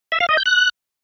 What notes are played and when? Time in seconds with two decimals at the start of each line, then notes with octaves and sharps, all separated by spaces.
0.12 E5
0.20 F5
0.29 D#5
0.37 G6
0.46 F#6